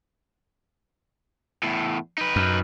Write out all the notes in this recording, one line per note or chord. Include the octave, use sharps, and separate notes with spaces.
E2 A2
D#4 B4
F#2